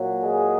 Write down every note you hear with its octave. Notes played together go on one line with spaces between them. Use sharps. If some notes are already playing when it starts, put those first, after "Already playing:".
Already playing: A#2 F#3
G#3 G#4